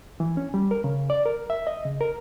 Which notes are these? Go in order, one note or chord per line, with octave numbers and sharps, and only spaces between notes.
E3
C#4
G3
A#4
C#3
D5
A#4
E5
D#5
C#3
A#4